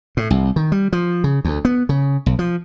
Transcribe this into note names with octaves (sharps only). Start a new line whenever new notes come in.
A2
C2
D#3
G3
F3
C#3
D2
B3
C#3
B1
F3